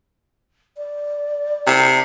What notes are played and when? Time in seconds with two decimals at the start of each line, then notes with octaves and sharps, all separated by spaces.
0.77 D5
1.67 C3